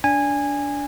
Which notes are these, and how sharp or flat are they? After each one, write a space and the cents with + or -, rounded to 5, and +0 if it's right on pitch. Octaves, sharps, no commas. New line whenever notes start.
D4 -20 G#5 -15